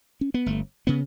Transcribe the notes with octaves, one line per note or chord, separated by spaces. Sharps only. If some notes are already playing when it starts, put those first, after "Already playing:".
C#4
B3
G1 A3
C#3 B3